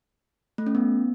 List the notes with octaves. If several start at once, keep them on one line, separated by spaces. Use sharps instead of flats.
A3
C#4
B3